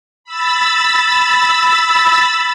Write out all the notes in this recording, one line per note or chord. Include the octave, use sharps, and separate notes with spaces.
B5 E6 A6